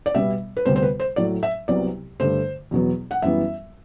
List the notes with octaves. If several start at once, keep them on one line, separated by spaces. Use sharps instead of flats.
D5
B2 G3 B3 E5
B4
D2 C3 G3 B3 C5
C5
B4
C5
A2 F#3 A3 D5
E5
C2 C3 F#3 B3 D5
G2 D3 A3 C5
E2 B2 F#3 B3
F#5
F#2 E3 G3 B3 E5